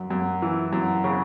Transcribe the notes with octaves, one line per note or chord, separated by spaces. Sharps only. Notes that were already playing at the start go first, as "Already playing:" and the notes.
Already playing: F#2
F#2
E3
F#2
C#3